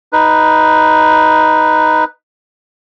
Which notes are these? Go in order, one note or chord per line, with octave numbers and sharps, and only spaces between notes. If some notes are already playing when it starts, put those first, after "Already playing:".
D#4 B4